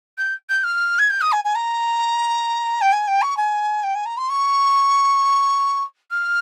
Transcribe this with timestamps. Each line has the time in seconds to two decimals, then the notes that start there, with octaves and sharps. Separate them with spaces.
0.18 G6
0.49 G6
0.63 F6
0.98 G#6
1.10 G6
1.21 D#6
1.32 G#5
1.44 G#5
1.55 A#5
2.81 G5
2.92 G#5
3.07 G5
3.22 C#6
3.37 G#5
3.83 G5
3.95 G#5
4.05 A#5
4.17 C6
4.29 C#6
6.10 F6